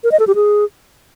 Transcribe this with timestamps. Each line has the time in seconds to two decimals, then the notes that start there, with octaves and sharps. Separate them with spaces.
0.04 A#4
0.12 D#5
0.20 A4
0.27 G4
0.35 G#4